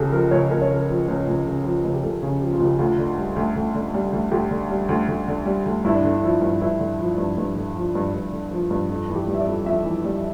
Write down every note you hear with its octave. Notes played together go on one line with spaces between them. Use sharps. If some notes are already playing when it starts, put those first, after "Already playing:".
Already playing: C#2 C#3 G4 A4
F3 A#4
C#2 C#5
C#2 A#4
C#5
C#3 A#4
F3
C#2
C#2
C#3
F3
C#2
G4
C#2 A4
C#3
F3 G4
F4
C#2
G4
D2 F4
D3
G3
D2
D2
D3
G3
D2
D2 G4
D3
G3
D2
D2
D3
G3
D2
G2 E4
D4
D3
D4
F3 E4
G2
G2 E4
D3
F3
G2
G2
D3
F3
G2
G2
D3
F3
G2
F2
E3
G4
G3
E5
D5
F2
F2 E5
E3
G3